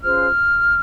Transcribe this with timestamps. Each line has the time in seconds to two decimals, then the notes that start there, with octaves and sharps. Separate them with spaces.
0.02 C#4 F4 G#4 C5 F6